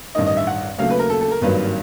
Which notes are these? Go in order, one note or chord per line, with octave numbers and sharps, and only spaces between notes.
A1 G2 D#3 D#5
D#5
E5
F#5
D#2 C#3 F#3 A3 F5
B4
A#4
A4
A4
A#4
G#1 G2 D#3 F#3 A#3 B4